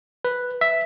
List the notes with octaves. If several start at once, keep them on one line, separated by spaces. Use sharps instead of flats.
B4
E5